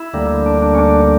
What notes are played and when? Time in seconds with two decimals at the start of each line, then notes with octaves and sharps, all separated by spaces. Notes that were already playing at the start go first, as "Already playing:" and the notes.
Already playing: E4
0.13 D2 D3 G3 A#3
0.46 D4
0.62 D4
0.75 C#4
0.78 D4